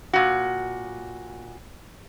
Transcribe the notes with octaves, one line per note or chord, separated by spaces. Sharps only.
A#2 F#4